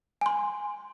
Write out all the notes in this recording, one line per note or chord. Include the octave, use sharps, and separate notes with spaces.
G#5 C6